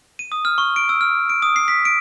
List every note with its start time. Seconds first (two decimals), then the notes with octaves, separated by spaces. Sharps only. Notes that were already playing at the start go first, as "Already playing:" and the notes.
0.19 D#7
0.32 D#6
0.45 F6
0.58 C#6
0.76 D7
0.89 E6
1.01 F6
1.30 D7
1.42 D#6
1.56 C7
1.68 B6
1.85 D7